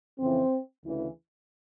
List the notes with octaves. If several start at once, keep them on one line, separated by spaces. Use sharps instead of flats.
F2 C#3 E3 C4
D2 C#3 E3